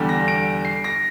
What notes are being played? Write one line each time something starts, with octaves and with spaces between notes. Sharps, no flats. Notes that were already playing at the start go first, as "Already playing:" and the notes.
Already playing: E2 D3 G3
A#6
D7
C7
A#6